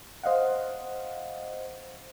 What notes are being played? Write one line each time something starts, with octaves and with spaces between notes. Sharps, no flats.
C5 D#5 F5 F#5